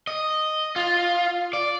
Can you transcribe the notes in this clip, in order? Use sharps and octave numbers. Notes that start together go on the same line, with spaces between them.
D#5
F4
D5